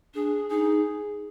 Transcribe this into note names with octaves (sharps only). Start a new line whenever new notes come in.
D4 G#4
D#4 G#4